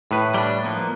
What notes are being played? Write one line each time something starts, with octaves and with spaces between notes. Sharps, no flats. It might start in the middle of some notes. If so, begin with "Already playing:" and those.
A2 B4
G3 D4
F3 A#3 B3